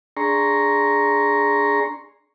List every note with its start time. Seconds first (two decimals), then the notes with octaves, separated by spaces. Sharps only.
0.17 D4 G#4 A#5 C6 C#6